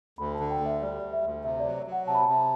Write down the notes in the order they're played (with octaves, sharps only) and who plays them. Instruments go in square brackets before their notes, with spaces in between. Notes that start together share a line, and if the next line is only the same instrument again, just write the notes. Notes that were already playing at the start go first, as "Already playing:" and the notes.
[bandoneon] D2 [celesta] B5
[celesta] A5
[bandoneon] D3
[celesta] G5
[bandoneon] D2
[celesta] E5
[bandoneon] G3 [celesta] D5
[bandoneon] D2
[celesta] E5
[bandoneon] D2
[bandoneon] C3 [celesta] E5
[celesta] D5
[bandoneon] F#3
F#3
[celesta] F#5
[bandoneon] C3 [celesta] A5
[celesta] B5
A5
[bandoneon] C3